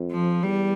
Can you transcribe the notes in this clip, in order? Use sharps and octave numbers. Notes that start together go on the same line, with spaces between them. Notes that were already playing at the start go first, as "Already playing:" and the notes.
Already playing: F2
F3
E2 G3